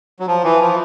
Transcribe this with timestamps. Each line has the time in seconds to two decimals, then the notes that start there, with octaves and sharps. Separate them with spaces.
0.20 F#3
0.27 F3
0.44 E3
0.60 F3